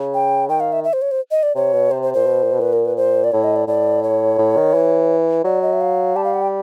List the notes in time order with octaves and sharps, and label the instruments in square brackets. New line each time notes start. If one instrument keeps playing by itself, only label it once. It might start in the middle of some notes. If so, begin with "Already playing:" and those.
Already playing: [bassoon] C#3
[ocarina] G5
[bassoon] D#3 [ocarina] G5
[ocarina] F5
E5
E5
C5
C#5
C5
D#5
D5
[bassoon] C3 [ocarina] C#5
[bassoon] B2
[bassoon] C3 [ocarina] C5
[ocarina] C5
[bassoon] A#2 [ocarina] C5
[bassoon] B2
A#2
B2
[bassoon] A#2 [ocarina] B4
[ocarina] A#4
B4
C5
D5
[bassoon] A2 [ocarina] C#5
[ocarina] D#5
D5
[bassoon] A2 [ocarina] D5
[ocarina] C#5
[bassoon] A2
D#3
E3
[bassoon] F#3 [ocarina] D5
[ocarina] D#5
E5
F5
[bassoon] G3 [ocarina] A5
[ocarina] F5
F#5
G5